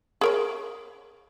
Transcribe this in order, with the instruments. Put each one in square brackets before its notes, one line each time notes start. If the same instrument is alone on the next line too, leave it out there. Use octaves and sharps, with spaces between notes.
[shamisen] G#4 A#4 C#5